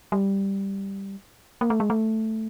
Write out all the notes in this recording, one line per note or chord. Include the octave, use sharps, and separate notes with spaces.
G3
A#3
A3
G#3
A3